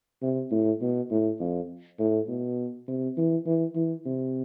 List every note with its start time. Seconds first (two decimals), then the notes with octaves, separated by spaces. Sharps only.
0.22 C3
0.51 A2
0.81 B2
1.11 A2
1.40 F2
1.99 A2
2.28 B2
2.88 C3
3.17 E3
3.46 E3
3.75 E3
4.05 C3